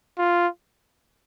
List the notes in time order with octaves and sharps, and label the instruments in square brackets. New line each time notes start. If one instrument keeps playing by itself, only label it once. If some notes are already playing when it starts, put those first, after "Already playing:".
[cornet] F4